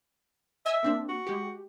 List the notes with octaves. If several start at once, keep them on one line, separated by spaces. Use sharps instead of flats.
D#5 E5 G#5 E6
A#3 C4 D4
F#4
G#3 G4